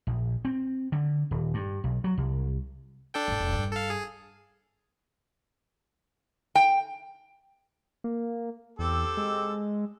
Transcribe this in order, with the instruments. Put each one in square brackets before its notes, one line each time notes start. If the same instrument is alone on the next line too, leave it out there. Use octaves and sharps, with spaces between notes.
[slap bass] A#1
C4
D3
D#1
G2
B1
F#3
C2
[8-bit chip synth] D4 A4 G5
[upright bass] G#2 E4
E1
G2
[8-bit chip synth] A4 F5
G#4
[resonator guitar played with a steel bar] G5
[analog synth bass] A#3
[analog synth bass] E2 [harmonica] C4 G4 A4
[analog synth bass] G#3